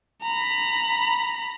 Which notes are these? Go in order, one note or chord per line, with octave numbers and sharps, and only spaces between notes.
A#5 B5